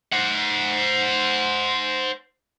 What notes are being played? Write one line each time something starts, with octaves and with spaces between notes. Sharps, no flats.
C5 F#5